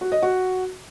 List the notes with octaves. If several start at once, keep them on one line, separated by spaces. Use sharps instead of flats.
F#4
D#5
F#4